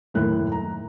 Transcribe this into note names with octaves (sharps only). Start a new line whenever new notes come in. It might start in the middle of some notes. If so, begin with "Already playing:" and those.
F#1 D#2 A2 A3 E4 F#6
A#5